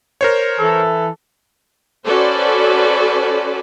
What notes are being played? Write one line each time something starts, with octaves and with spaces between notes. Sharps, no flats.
A#4 C5 C#5
E3 A4
C#4 F#4 A4 B4 C5 D5